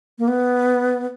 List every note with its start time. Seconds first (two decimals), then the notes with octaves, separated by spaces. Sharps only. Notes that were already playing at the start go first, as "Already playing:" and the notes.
0.19 A#3
0.28 B3